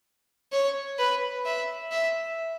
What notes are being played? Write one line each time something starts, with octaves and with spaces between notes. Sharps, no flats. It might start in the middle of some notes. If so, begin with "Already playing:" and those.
C#5
B4
E5
E5